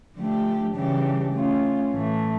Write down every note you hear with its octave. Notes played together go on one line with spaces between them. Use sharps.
D3 F3 A3 D4 G4
C#3 E3 G3 D4 G4
A3 C#4 F4
A2 E3 A3